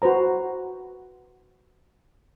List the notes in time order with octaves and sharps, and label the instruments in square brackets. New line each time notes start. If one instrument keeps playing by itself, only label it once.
[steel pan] F#4 B4 C5 A#5